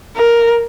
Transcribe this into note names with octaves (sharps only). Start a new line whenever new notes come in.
A#4